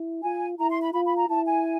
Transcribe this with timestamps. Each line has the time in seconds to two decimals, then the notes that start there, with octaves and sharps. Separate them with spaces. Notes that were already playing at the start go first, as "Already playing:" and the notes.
Already playing: E4
0.23 F4 G#5
0.58 E4 A#5
0.70 C6
0.82 B5
0.93 F4 B5
1.05 B5
1.17 A#5
1.28 E4 A5
1.46 G#5